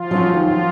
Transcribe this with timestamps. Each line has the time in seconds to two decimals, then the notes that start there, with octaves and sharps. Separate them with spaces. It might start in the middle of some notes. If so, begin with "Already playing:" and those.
Already playing: F3 F4
0.11 F#3 C#4 F#4
0.34 D#2 F3 F4